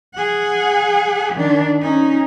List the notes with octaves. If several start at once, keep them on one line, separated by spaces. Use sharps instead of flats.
G#4 F#5
D#3 D4
C#4 D#4